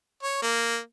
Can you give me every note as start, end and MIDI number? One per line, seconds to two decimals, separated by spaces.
0.23 0.39 73
0.42 0.78 58